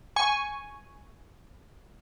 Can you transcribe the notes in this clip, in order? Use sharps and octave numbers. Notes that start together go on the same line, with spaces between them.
G#5 C#6